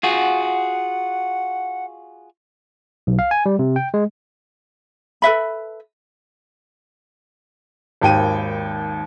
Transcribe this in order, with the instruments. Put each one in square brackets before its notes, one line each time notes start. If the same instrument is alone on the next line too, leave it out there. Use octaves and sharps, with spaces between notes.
[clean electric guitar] F4 F#4 G#4 [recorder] F#5
[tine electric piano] B1
F5
G#5
G3
C3
G5
G#3
[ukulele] A4 B4 E5 B5
[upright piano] G#1 D#2 G5 D#7